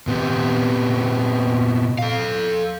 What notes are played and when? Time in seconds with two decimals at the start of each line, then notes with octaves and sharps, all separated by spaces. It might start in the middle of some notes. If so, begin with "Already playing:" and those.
0.07 A#2 B3 C4 G4
1.99 A4 F5